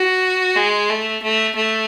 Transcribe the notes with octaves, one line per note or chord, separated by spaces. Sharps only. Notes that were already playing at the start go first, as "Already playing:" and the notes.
Already playing: F#4
G#3
A3
A3
A3